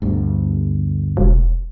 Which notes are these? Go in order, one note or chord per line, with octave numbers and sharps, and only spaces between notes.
G1 D2
E1